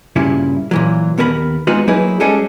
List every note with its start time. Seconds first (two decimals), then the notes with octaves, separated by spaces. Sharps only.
0.16 G2 A#2 C#3 E4
0.71 A#2 E3 F#3
1.18 D#2 B3 A#4 G#5 B5
1.67 G#3 B3 C4 D#4 F4 F#4
1.88 F#3 A#3 D#4 E4 G#4 B4
2.20 G3 G#3 C#4 F#4 G#4 A4